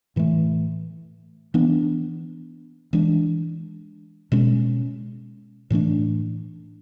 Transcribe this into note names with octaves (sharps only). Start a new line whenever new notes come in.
A2 E3 A3
E3 B3 D4
E3 G#3 D4
B2 G#3 C#4
A2 E3 A3 D4